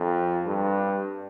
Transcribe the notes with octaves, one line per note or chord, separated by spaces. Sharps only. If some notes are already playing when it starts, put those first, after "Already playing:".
Already playing: F2
G2